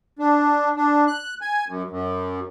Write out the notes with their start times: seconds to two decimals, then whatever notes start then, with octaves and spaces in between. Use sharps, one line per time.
0.19 D4
0.76 D4
1.08 F#6
1.41 G#5
1.68 F#2
1.90 F#2